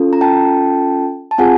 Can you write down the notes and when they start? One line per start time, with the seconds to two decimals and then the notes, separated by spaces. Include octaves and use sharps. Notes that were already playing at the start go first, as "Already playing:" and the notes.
Already playing: C#4 F4 A4
0.13 A#5
0.21 G5 A5
1.31 A5
1.38 C4 F4 G#4 F#5 G#5